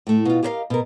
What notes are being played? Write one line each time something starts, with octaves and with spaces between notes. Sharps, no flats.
A2 A3
B2 F4
G4 G#4 A#4 C5 D#5 F5
B2 A#4